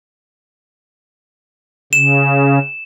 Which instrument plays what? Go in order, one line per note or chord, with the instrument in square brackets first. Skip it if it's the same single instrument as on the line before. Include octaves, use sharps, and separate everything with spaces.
[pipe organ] C#3 [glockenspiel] E7